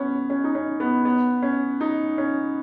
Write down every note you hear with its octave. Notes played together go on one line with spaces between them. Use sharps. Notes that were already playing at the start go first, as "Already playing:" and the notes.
Already playing: B3 C#4
C#4
D#4
C#4
B3
B3
C#4
D#4
C#4